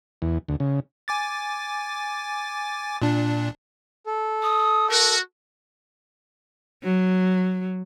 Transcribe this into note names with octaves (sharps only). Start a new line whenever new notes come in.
E2
D2
C#3
G#5 D6 A6
A#2 D4
A4
D#6
F#4 A#4
F#3